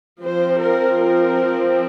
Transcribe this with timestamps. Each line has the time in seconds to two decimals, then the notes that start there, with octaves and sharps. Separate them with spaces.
0.22 F3 C4 C5
0.62 A#4
1.02 A#4